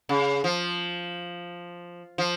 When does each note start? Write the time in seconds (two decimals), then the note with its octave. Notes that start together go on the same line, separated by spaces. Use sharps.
0.09 C#3
0.44 F3
2.18 F3